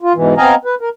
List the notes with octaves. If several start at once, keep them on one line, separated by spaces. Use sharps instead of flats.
F4
G#2 B2 E3
B3 C4 D#5 F5 G#5 A#5
B4
A#4